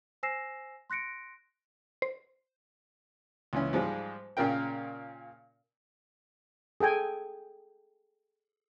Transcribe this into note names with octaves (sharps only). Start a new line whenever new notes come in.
C5 G#5 E6 A#6 C7 E7
C6 F#6 A#6 C#7 D7
C5
C#2 E3 C#4
G#2 F3 G3 G#3
A#2 C#3 F4 A#4 G5
G#4 A4 G5 G#5